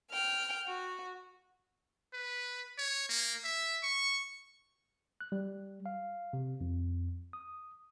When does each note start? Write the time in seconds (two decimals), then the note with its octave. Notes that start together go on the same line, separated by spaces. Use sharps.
0.10 G5 F6
0.66 F#4
2.14 B4
2.78 C#5
3.09 A#3
3.44 E5
3.83 C#6
5.21 F#6
5.32 G3
5.86 F5
6.33 C3
6.61 F2
7.33 D#6